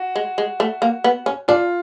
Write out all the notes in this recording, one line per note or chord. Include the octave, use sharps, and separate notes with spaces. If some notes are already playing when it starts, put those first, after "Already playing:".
Already playing: F#4
G#3
G#3
A3
A#3
B3
C#4
D4 F4